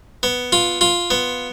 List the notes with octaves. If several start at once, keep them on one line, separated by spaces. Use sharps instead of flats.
B3
F4
F4
B3